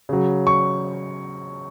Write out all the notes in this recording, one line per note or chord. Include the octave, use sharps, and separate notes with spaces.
C#3 F#3
C#6